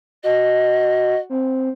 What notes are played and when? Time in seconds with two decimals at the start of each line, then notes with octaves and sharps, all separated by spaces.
0.23 F#4 D#5
1.30 C4